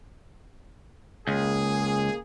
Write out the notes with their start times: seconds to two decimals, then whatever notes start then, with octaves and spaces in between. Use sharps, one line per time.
1.27 C#2 A#3 G#4